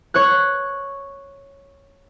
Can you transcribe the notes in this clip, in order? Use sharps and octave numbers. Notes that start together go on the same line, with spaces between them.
C#5 F#6